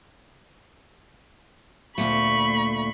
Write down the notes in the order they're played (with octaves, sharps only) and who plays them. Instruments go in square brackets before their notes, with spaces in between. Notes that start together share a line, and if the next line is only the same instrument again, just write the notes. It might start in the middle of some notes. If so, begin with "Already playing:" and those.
[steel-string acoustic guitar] D2 A#2 A3 [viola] B5 C#6